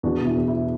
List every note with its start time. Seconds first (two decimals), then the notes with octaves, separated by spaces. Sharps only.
0.03 E2 D4 F#4
0.19 B2 F#4
0.26 E4
0.36 E2
0.48 E4